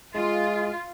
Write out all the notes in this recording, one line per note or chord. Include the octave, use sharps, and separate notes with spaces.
G#3 F4